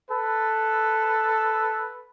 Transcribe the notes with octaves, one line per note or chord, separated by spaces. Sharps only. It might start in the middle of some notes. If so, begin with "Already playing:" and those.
A4 B4